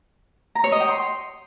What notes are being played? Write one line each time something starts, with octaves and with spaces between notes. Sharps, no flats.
A#5
C#5
D#5
G5
C6